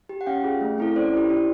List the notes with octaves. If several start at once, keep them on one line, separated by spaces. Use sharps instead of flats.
G4
F#5
C#4 F5 G5
F4 G#4
A3
C4 E4 A4
C#4 C5 D5
E4 G4
D4